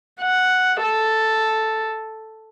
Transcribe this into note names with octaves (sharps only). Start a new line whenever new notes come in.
F#5
A4